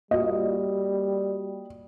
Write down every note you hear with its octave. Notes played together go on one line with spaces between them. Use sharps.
G3 A#3 F4 F#4 D#5